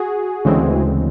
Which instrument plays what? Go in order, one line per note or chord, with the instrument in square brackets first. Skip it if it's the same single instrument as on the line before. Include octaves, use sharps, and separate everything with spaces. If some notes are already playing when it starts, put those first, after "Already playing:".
Already playing: [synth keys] F#4 G#4
D2 C#3 E3 G#3 C4